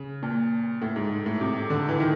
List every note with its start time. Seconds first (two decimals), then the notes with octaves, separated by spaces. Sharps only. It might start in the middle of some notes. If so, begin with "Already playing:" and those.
Already playing: C#3
0.23 A#2
0.82 A2
0.96 G#2
1.26 A2
1.41 C3
1.70 D3
1.89 E3
2.00 D#3